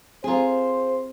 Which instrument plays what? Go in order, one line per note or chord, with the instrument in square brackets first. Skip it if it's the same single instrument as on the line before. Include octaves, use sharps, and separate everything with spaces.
[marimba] C4 A4 A#5 [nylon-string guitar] F4 G#4 [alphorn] C5